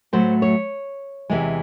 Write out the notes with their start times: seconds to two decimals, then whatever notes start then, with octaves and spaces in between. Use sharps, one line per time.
0.13 A2 F#3 A3 C5
0.42 C#5
1.30 E2 C3 E3 G#3